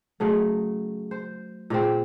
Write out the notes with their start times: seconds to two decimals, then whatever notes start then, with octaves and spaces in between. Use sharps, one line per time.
0.20 C#3 F#3 A3
1.11 C5
1.70 A#2 C#3 C4